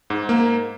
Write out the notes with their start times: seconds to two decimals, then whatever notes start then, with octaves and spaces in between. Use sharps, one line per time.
0.10 G#2
0.29 A#3